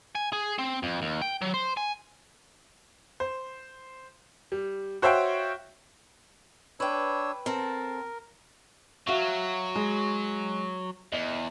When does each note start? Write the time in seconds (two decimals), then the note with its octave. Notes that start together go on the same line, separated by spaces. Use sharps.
0.15 G#5
0.33 G#4
0.59 C4
0.83 F2
1.02 D#2
1.22 G5
1.42 F#3
1.54 C5
1.77 G#5
3.20 C5
4.52 G3
5.02 F#4 C5 C#5 E5 F5 G5
6.80 D4 B4 C#5 G5 E6
7.46 C4 A4 A#4
9.07 F#3 F#4 E5 F5
9.75 G#3
11.12 E2 D#5